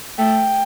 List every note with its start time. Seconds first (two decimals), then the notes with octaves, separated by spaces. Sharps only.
0.18 A3 G5